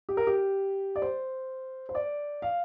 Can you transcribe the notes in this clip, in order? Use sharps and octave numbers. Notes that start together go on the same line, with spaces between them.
G4
A#4
G4
D5
C5
C5
D5
F5